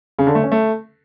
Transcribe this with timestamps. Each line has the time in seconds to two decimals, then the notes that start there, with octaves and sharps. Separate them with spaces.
0.19 C#3
0.27 D3
0.35 A3
0.43 C#4
0.52 A3